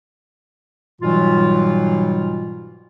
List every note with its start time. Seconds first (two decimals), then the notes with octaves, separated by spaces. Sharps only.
1.01 G#2 B2 E3 F#3 G3 F4